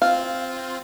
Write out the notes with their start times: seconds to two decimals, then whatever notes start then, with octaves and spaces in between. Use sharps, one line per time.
0.02 C4 F4 F5